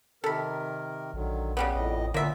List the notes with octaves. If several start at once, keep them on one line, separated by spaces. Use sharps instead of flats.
C3 D#3 A4 A#4 B5
A#1 D3 D#3 F#3
C#3 G3 B3
A1 F2 A2 D#5
A#2 D3 A#3 B3 F4 E5